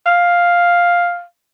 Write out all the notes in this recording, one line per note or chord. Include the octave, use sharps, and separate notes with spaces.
F5